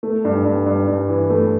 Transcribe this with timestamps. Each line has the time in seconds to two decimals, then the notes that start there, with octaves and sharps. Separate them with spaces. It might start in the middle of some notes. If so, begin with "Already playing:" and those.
0.03 A3
0.25 G2
0.45 G2
0.66 G2
0.87 G2
1.08 E3
1.30 A3